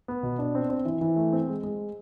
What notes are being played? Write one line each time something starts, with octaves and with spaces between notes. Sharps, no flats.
B3
B2
D4
C4
C4
E3
E3
A3
C4
G#3
G#3